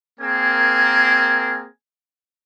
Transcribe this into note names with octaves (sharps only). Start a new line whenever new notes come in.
A#3 C4 G#4 A#4 G#5